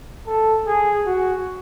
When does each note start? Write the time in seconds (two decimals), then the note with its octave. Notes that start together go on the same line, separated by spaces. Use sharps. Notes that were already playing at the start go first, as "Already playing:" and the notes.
0.27 A4
0.67 G#4
1.06 F#4